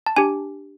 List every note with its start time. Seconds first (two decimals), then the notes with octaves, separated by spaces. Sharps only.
0.06 A5
0.17 D4 G4 G#5